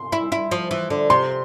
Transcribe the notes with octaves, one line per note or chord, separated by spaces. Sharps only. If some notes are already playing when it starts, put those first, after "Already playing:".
Already playing: C6
E4
E4
F3
E3
D3
C3 C6